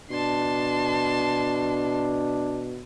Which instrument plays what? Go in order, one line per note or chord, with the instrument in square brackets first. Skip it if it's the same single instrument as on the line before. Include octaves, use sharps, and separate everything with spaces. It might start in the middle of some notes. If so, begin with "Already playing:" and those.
[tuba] B2 [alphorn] D4 [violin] A5 C6